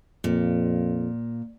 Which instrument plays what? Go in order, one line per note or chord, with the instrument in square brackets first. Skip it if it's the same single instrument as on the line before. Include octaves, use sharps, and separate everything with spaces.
[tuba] F2 [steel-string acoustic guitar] A#2